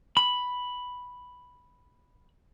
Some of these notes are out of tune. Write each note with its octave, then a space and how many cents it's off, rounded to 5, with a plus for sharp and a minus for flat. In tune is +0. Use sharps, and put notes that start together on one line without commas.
B5 +0